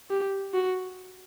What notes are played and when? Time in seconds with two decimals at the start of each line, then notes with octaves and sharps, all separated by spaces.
0.10 G4
0.54 F#4